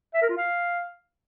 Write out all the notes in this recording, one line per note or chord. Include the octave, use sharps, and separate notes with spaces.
E5
A#4
F4
F5